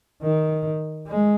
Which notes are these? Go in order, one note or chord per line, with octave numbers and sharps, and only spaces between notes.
D#3
G#3